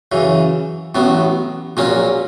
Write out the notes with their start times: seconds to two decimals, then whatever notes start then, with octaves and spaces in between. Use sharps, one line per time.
0.12 F#2 C#3 E3
0.95 A1 A2 F#3 B3
1.77 A#1 A#2 F#3 A#3 C#4